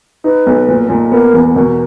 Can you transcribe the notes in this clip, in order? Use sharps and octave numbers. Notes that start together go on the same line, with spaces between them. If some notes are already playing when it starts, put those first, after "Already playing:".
D#4 B4
B1
A#2
A#2
B3 A#4
E2
B2 A#4